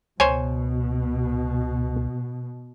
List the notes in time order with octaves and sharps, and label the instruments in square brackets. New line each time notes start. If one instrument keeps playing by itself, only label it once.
[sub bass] C#2 [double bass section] B2 [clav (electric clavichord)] C5 C#5 G#5